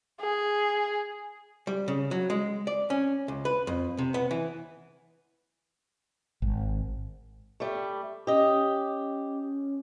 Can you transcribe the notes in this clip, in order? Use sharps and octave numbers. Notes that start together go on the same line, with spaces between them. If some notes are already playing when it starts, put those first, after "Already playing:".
G#4
G3
C#3
F#3
G#3
D5
C#4
C#2
B4
F2
C3
B3
E3
G#1
G3 A3
C#4 G4 D#5